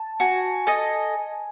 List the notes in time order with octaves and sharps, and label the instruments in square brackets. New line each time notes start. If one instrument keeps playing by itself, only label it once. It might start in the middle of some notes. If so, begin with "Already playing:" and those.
Already playing: [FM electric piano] A5
[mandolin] F#4 [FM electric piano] G#5
[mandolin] A4 D#5 [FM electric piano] G#5